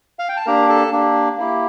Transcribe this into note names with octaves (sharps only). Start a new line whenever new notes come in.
F5
G5
A5
A#3 D4 G4 A#4 A#5
A4 A5
A#3 D4 G4
A#3 E4 G4